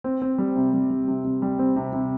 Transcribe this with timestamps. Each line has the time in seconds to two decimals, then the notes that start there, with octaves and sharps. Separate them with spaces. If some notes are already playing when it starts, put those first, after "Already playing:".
0.04 C4
0.22 C4
0.38 G3
0.56 C3
0.73 G3
0.90 G3
1.08 C3
1.24 C3
1.42 G3
1.59 C4
1.76 C3
1.93 C3